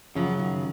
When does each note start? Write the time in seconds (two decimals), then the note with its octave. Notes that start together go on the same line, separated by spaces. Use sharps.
0.15 F#2 C#3 F3 F#3
0.39 D#3